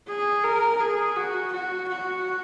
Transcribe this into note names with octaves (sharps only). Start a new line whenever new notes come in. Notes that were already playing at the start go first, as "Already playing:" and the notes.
G#4
A#4
G#4
F#4
F#4
F#4